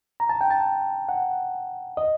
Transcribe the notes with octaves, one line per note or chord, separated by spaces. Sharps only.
A#5
A5
G5
A5
F#5
D#5